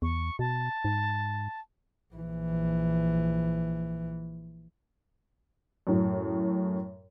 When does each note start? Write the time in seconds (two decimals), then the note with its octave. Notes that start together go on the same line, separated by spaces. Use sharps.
0.02 E2 C#6
0.39 B2 A5
0.85 G#2
2.14 A#1 E3
5.87 F#2 A2